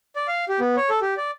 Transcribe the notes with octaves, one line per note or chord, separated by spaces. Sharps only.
D5
F5
G4
B3
C#5
A4
G4
D5